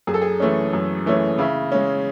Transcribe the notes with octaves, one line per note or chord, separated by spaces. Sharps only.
F#2 G#4
A4
G#4
E3 A3 C#4
F#2
E3 A3 C#4
C#3 E4
G#3 C#4